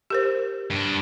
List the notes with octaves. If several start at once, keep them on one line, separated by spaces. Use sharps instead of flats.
G4 A#4 C5
G2 D4